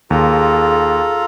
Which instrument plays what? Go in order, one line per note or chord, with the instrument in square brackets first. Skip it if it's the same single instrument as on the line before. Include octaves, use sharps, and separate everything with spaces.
[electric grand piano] D#2 [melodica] F4 A4 A#5 [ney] G#4